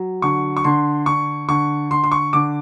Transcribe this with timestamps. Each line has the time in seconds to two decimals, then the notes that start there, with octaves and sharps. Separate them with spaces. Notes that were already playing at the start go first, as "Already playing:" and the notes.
Already playing: F#3
0.22 D3 C#6
0.57 C#6
0.64 D3 C6
1.06 D3 C#6
1.49 D3 C#6
1.91 D3 C6
2.04 C6
2.12 C#6
2.33 D3 D6